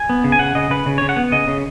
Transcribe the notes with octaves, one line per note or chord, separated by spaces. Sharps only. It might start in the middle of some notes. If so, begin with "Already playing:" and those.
Already playing: G#5
B3
C#3
G#5
C#3 F#5
C#3 D#5
C#3 B4
C#3
C#3 C#5
F#5
B3
C#3 D#5
C#3